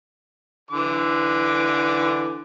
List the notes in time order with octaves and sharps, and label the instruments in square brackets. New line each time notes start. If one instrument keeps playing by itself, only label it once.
[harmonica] D3 E3 D6